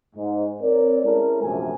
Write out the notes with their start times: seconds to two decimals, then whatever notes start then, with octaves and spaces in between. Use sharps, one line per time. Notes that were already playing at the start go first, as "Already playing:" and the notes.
0.16 G#2
0.61 C4 A#4 C#5 D5
1.04 G#3 C#4 E4 A4 A#4
1.43 A#1 F#2 C3 A3 F#4 G#5